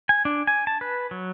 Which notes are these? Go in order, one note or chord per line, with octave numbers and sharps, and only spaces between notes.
G#5
D4
G#5
A5
B4
F#3